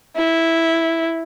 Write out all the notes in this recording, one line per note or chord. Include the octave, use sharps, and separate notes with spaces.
E4